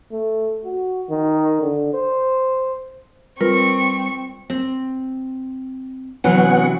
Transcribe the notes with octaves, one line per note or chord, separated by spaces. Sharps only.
A3
F#4
D#3
D3
C5
G3 C4 F4 A#4 B4 C#6
C4
C3 E3 F#3 B3 C#4 F#5